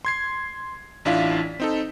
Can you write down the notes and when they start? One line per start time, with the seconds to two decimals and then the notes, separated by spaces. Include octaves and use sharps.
0.05 C6 G#6 C7
1.05 A1 D4 E4 F4 F5 B6
1.60 C4 D#4 A4